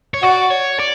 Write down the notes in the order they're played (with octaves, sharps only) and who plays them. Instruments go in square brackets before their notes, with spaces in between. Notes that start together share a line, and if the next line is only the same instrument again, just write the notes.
[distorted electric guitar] C#5
[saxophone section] F#4 [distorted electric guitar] D5
[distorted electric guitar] C#5
D5